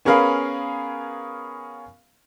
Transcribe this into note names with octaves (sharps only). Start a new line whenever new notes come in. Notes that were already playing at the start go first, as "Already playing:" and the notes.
B3 C#4 G#4 A#4 F5 B5